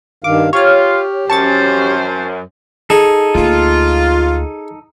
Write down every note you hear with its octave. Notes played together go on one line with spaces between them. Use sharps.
G2 D#3 F5 D6
F4 G4 C#5 F6
F#2 C#4 C5 A5 C#6 A6
D#4 G#4 A4
D2 A#3 F4